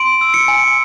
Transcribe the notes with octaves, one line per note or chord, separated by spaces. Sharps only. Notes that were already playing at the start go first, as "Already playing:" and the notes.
Already playing: C6 D7
E6
C#7
G#5